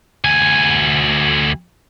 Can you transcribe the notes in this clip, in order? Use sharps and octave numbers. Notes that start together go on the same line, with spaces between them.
D2 G#5